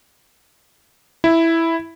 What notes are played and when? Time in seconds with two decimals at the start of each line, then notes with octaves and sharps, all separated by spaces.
1.24 E4